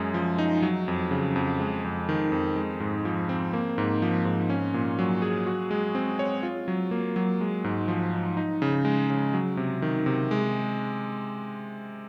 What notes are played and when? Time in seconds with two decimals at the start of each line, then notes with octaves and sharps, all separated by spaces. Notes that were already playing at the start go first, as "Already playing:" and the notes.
Already playing: F#2 G#3 G#4
0.14 F3
0.38 D#4
0.62 F#3
0.88 F2
1.11 C#3
1.36 F2
1.60 G#3
1.84 F2
2.09 D#3
2.32 F2
2.56 G#3
2.80 G#2
3.05 F3
3.29 C4
3.53 A#3
3.78 G#2
4.02 F3
4.25 G#2
4.50 C#4
4.74 A#2
4.99 F#3
5.22 G#4
5.47 F#4
5.71 G#3
5.95 C4
6.19 C#5
6.43 F4
6.68 F#3
6.91 A#3
7.16 F#3
7.41 G#3
7.64 G#2
7.88 F3
8.13 D#4
8.37 D#4
8.62 C#3
8.85 G#3
9.10 C#3
9.34 F#3
9.57 C3
9.82 D#3
10.06 C3
10.31 G#3